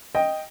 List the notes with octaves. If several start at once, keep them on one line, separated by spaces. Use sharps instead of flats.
D#5 G5